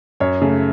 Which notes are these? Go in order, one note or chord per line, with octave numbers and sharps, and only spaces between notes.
F#2 C#5
C#3 A3